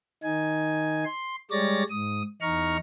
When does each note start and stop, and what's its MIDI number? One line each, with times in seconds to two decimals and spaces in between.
0.23 1.04 51
0.23 1.04 63
0.23 1.04 80
1.05 1.36 84
1.51 1.83 55
1.51 1.83 56
1.51 1.83 73
1.51 1.83 74
1.51 1.83 93
1.51 1.83 94
1.90 2.22 44
1.90 2.22 87
2.42 2.77 40
2.42 2.77 63
2.42 2.77 82
2.42 2.77 85
2.42 2.77 89